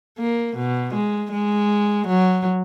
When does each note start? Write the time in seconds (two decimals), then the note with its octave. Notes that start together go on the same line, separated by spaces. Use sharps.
0.18 A#3
0.56 B2
0.94 G#3
1.32 G#3
2.07 F#3